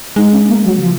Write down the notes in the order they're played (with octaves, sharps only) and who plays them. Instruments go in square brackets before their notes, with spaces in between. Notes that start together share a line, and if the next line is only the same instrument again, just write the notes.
[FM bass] G#3 [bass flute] D#4
[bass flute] C#4
A#3
F#3
[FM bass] C#3 [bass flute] F3